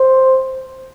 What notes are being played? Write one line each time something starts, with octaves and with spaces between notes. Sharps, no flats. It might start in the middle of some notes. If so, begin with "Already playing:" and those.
Already playing: C5